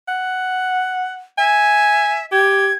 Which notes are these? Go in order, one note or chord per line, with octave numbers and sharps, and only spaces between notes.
F#5
E5 G#5
G4 G#6